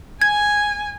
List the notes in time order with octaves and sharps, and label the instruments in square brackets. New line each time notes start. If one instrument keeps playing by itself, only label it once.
[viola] G#5 [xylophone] G#6